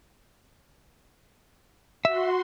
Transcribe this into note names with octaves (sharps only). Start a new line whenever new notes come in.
F#4 E5 C6